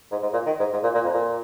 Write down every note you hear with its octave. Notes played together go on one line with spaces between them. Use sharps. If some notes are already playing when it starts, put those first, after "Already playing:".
G#2
G#2
A#2
D#3
G#2
G#2
A#2
A#2
F2
A#2